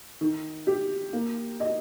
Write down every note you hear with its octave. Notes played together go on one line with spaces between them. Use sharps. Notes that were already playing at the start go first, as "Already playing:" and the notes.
D#3
G4
A#3
D#5